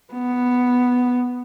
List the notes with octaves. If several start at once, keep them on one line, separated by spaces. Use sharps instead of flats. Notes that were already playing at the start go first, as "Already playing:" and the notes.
B3